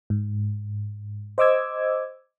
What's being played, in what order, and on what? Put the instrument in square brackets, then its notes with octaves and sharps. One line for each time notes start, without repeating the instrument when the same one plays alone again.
[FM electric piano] G#2
C5 D#5 D6 E6 G#6